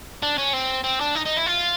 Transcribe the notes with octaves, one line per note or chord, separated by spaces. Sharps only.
D4
C#4
C4
C4
D4
D#4
D#4
E4
F4